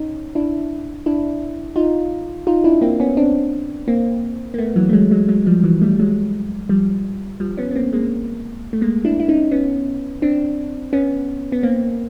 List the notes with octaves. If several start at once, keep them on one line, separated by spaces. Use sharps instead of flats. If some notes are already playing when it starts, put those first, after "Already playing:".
Already playing: C#4 D#4
D4 E4
D4 E4
D#4 F4
D#4 F4
D4 E4
A#3 C4
B3 C#4
C4 D4
A#3 C4
A#3
A3 B3
E3 F#3
A3
F#3 G#3
F#3 G#3
F#3 G#3
F3 G3
E3 F#3
G3 A3
F#3 G#3
F3 G3
F3 G3
B3 C#4
B3
A#3 C4
G#3 A#3
A3
G#3 A#3
D4 E4
E4
C#4 D#4
B3 C#4
C4 D4
B3 C#4
B3
A#3 C4